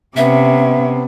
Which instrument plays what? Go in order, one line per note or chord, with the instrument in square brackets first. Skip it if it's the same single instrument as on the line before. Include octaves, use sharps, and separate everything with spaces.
[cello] C3 C#4 [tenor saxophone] B3 [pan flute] E5